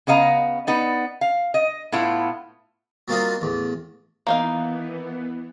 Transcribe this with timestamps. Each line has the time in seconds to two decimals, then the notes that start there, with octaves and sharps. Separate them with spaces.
0.07 C#3 B3 D#5 F5 A#5
0.67 B3 D#4 D5
1.21 F5
1.54 D#5
1.92 A2 B3 E4 F4
3.08 F#3 G3 A#3 C4 D#4 F4
3.41 A1 E2
4.27 E3 A#3 B3 D#4 F5